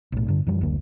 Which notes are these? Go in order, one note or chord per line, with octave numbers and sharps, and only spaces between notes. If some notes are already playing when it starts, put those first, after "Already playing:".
B1 A2
G2 D3
F#2 E3 F3 G3
F#1 D2 F#3 A#3